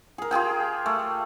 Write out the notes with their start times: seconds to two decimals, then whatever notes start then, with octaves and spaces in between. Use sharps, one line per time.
0.18 G#4 A#4
0.31 F4 G4 G#4 G5
0.86 A3